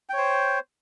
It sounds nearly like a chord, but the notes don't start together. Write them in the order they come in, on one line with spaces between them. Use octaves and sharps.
G5 C#5 C5